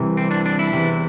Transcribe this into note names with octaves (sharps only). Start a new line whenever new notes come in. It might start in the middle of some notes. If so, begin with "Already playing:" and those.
Already playing: C2 C3 E3
C4
D4
D4
E4
E2 C3 E3